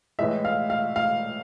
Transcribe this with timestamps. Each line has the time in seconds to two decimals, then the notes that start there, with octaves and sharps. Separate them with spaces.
0.19 A2 E3 G#3 E5
0.45 F5
0.70 F5
0.96 F5